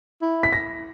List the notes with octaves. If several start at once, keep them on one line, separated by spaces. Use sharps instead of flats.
E4
B6
A#6